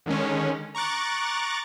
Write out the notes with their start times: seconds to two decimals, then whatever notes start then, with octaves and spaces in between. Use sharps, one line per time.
0.06 D3 D#3 G#3 C#4
0.75 A#5 C#6 D6 F#6 A6